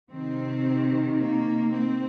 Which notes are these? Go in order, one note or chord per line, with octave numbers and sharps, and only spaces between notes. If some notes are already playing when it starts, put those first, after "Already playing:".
C3 D#3 C4
A#3
C4